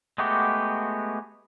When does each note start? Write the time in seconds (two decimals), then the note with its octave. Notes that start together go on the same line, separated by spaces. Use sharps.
0.18 G#3 A3 B3 F#4 G4